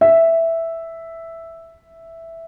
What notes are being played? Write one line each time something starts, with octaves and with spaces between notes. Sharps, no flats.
E5